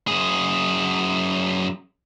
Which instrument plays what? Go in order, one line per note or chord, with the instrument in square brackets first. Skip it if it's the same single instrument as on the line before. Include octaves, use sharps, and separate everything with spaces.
[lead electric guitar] F#2 G#4